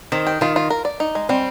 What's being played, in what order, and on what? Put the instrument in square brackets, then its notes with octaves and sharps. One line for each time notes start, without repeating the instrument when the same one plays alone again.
[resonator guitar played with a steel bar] D#3 [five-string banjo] C4
[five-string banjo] G4
[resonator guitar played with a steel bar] D#3 [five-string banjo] F4
[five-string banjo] F4
A#4
D5
D#4
G#3
[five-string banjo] G3 [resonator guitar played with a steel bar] C4